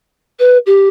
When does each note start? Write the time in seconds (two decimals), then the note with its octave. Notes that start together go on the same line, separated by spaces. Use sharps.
0.39 B4
0.66 G4